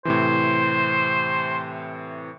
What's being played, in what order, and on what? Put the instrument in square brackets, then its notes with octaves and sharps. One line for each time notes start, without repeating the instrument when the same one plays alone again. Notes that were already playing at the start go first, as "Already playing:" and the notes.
[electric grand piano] A2 C3 E3 [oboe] C5